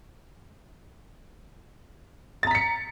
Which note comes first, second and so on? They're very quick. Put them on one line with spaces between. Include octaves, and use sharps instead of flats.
A6 A#5 B6 C#7